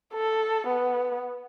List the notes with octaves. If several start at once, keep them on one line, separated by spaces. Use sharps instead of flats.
A4
B3